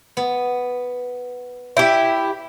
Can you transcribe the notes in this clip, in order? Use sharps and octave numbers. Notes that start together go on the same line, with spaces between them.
B3
E4 G4 G5